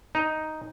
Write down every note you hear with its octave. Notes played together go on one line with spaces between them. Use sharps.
D#4